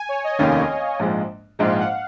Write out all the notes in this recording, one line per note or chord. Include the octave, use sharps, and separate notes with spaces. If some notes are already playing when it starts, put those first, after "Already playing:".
Already playing: G#5
C#5
D#5
F1 D#2 D#3 A#3 C#4 F5
D#5
F5
A#1 G#2 F3 G#3
A#1 G#2 F3 G#3 F5
F#5